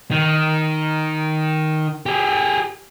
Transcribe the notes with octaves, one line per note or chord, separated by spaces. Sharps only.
D#3
G4 G#4